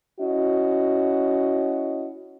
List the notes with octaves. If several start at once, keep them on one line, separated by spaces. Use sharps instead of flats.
C#4 E4 F#4 D#5